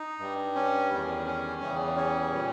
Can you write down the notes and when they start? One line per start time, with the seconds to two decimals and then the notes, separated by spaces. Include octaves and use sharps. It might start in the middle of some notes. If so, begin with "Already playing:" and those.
Already playing: D#4
0.19 G2 G3
0.55 C#4
0.91 E2 D#3 G3
1.26 C#4
1.62 E2 C#3 E3 G3
1.97 C#4
2.32 A#2 G3